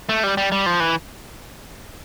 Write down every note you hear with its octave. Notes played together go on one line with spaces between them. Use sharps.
A3
G3
G3
G3
F3
E3